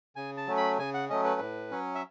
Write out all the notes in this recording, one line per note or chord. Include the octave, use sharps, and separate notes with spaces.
C#3 G#5
A5
F#3 A3 C#4
B5
C#3 G#5
F#5
F#3 A3 C#4 D#5
B4
A2
F#3 C#4
E5